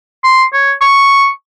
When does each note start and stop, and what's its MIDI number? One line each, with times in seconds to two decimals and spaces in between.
0.24 0.44 84
0.53 0.72 73
0.81 1.28 85